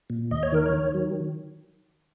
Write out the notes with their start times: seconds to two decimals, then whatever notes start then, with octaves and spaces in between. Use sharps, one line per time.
0.10 A#2
0.31 D#2 D#5
0.43 C#5
0.52 D#3 A#4
0.66 C#5
0.74 D#3
0.94 F#3